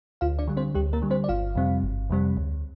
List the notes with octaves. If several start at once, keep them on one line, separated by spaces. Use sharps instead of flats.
D2 F4 F5
D4 D5
D3 G3
C4 C5
D2 G3 G4
A#3 A#4
D3 G3
C4 C5
D5
G1 F4 F5
F2 C3 G3 C4
G1
F2 C3 G3 C4
D2